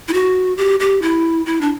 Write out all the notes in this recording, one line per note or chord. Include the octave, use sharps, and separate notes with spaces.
E4
F#4
G4
G4
E4
E4
D4